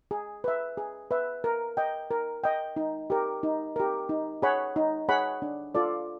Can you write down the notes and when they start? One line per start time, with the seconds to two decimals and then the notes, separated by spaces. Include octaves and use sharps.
0.11 G#4
0.44 B4 E5
0.77 G#4
1.11 B4 E5
1.44 A#4
1.77 D#5 G5
2.11 A#4
2.44 D#5 G5
2.76 D#4
3.10 G4 A#4
3.43 D#4
3.76 G4 A#4
4.09 D#4
4.42 G#4 C#5 F#5 B5
4.76 D#4
5.09 G#4 C#5 F#5 B5
5.42 D4
5.75 F4 A4 D5